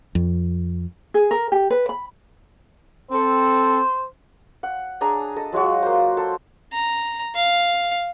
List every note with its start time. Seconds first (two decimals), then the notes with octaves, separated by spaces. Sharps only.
0.15 F2
1.14 G#4
1.31 A#4
1.52 G4
1.70 B4
1.89 B5
3.11 C4 A4 C5
4.63 F#5
5.01 D4 G#4 G#5 A#5
5.36 A4 D#5
5.52 F#3 G#3 F4 F#4
5.83 A#3 C5
6.17 A4 C6
6.73 A#5
7.36 F5